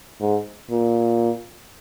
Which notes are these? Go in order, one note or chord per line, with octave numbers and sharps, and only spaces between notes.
G#2
A#2